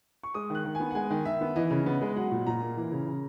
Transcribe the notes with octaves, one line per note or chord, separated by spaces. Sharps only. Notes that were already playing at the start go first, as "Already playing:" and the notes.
C#6
G#3 D#6
D#3 F#6
D#3
G#5
B3
F#5
G#3 G#5
D#3
D#3 E5
B3
E3 D#5
C#3
B3
G#3
F#3 F#5
A#2
A#2 A#5
A#3
E3
C#3
C#3